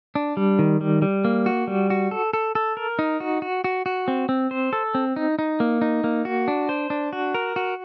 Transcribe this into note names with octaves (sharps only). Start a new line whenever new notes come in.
D4
G3
D#3
G3
G3
A#3
F#4
G3
F#4
A4
A4
A4
A#4
D#4
F#4
F#4
F#4
F#4
C4
C4
C5
A4
C4
D#4
D#4
A#3
D#4
A#3
F#4
D4
C5
D4
F#4
A#4
F#4